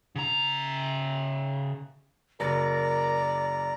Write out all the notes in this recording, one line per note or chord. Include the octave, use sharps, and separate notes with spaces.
C#3 A#5
F#1 A#4 D5 A#5